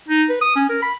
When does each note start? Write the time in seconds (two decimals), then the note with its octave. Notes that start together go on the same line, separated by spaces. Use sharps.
0.08 D#4
0.29 B4
0.41 D#6
0.56 C#4
0.69 A#4
0.82 B5